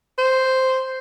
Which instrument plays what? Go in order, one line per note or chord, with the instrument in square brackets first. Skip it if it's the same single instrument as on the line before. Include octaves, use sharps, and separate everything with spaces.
[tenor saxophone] C5